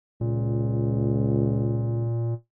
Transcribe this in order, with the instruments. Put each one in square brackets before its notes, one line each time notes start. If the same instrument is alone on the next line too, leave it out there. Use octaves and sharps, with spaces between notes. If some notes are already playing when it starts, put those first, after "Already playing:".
[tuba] C#2 [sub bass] A#2